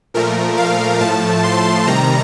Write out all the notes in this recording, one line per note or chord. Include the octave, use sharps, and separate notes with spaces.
A#2 F3 A3 A#4
F5
A2 F3 A3 A5
C6
C3 D#3 G3 A#5